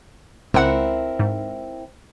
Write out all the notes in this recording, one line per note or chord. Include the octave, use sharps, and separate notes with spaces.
C#2 C4 E4 A#4 F#5
G#2